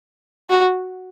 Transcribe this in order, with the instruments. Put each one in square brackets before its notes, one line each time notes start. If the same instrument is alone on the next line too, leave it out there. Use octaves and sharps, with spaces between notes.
[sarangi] F#4